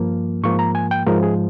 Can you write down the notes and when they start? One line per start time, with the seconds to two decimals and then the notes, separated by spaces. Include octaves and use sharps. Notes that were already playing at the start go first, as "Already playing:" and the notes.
Already playing: G2 F3 A#3
0.44 G#2 F3 A#3 C#6
0.59 A#5
0.75 G#5
0.91 G5
1.07 G#2 F3 G#3 A#4
1.23 G#4